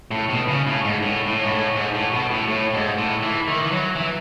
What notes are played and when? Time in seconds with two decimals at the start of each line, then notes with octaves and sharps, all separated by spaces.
0.11 A2
0.30 B2
0.48 C#3
0.67 A2
0.84 G#2
1.03 A2
1.27 A2
1.43 G#2
1.51 A2
1.76 G#2
1.95 A2
2.13 B2
2.31 A2
2.49 A2
2.74 G#2
2.98 A2
3.22 E3
3.48 D#3
3.63 E3
3.71 F#3
3.96 E3